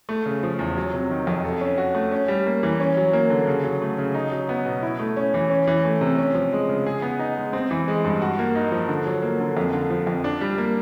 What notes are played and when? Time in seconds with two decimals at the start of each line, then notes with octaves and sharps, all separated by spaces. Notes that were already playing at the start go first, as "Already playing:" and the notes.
0.09 A3
0.26 C#3
0.43 F3
0.59 E2
0.77 F#3
0.94 C3
1.11 D#3
1.27 F2
1.44 A4
1.61 C#4
1.78 F#4
1.95 A3
2.12 C#4
2.28 G3
2.46 A#3
2.63 E3
2.80 C#4
2.97 F#3
3.13 A#3
3.30 D3
3.47 C#3
3.64 F#3
3.82 A3
3.98 C#3
4.14 D#4
4.32 F#3
4.49 B3
4.66 B2
4.82 E4
4.99 A3
5.17 C#4
5.34 E3
5.50 C#4
5.67 E3
5.85 A3
6.01 C3
6.18 C#4
6.34 F3
6.53 G#3
6.69 C#3
6.86 G#4
7.02 B3
7.19 D#4
7.37 G#3
7.53 C4
7.71 E3
7.88 G#3
8.04 G2
8.22 F#4
8.39 A#3
8.56 D#4
8.72 F3
8.88 D3
9.06 F#3
9.22 A#3
9.40 D3
9.57 F2
9.73 D3
9.90 F3
10.07 F2
10.24 D4
10.41 G3
10.58 A#3